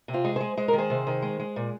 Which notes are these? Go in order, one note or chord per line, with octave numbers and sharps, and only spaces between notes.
C3
C4 F4
G#3
G#3 G#4 C5
G#3 C5
D#3 A#4
G#4 C5
C3
D#3
G#3
G#3
A#2